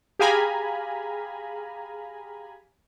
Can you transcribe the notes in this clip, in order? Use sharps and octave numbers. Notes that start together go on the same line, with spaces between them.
G4 G#4 F5 G#5 A#5 B5